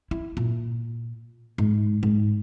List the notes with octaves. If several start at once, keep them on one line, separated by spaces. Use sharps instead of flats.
E4
A#2
G#2
G#2